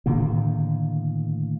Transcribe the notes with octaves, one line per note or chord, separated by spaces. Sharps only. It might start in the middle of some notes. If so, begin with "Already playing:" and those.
A2 D3 D#3 A#3